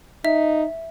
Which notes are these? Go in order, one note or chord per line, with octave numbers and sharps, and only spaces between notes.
D#4 E5